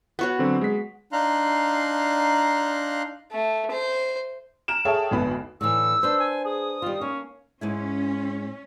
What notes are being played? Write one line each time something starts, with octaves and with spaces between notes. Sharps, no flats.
B3 F#4 C#5 F#5
D3 F#3 C4
G#3 B6
D4 D#4 F5 A#5 C6 F#6
A3
C5
A#5 F6 D7 E7
G#4 A4 C#5 E5 G5 A5
G#1 D2 B3 B5
A2 D3 E3 E6
D4 B4 C5
G#5
G#4 D#6
D#3 G3 F4
A#3 C#4
G#2 G#3 C#4 E4